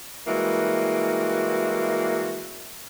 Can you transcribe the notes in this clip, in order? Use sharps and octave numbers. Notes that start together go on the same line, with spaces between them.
E3 G3 G#3 A#3 F#4